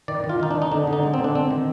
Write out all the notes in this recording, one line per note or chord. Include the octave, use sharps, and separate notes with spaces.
D#3 D5
D#3
F4
D#3 D#4
D4
D#3
D#4
D3 D4
D3
D#4
G#3
C4
D3
D4
C4
D#3